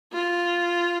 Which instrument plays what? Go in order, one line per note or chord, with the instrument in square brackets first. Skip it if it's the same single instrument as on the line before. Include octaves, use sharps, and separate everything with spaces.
[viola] F4